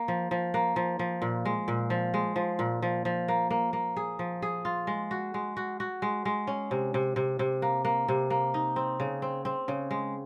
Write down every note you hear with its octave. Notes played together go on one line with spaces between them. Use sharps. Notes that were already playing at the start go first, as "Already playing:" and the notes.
Already playing: A#3
F3
F3
A#3
F3
F3
A#2
G#3
A#2
F3
G#3
F3
A#2
F3
F3
A#3
A#3
A#3
G#4
F3
G#4
F4
G#3
F#4
G#3
F#4
F#4
G#3
G#3
C#4
C3
C3
C3
C3
A#3
A#3
C3
A#3
D#4
C4
C#3
C4
C4
C#3
G#3